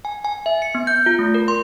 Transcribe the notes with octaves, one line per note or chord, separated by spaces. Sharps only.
G#5
G#5
E5
C#7
B3
G6
F4
A3
A#4
C6